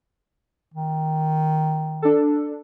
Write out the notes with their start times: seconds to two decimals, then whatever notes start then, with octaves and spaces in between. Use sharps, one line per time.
0.74 D#3
2.02 D4 A4